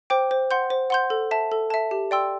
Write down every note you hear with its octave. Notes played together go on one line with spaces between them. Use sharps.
C5 G5 D6
C5
F#5 C6 G6
C5
F#5 C6 G6
A4
E5 A5
A4
E5 A5
G4
D5 G5 C6 E6